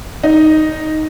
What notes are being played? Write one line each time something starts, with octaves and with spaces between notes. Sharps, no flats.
D#4